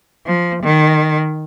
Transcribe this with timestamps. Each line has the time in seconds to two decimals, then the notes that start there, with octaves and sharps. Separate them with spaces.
0.26 F3
0.63 D#3